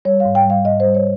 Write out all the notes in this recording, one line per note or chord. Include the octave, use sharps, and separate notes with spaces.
G3 C#5
F5
G#2
G5
G3 F5
G#2 D#5
G3 C5
C#5